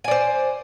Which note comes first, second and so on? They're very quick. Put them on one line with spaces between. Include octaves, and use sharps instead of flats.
G#5 D5 C5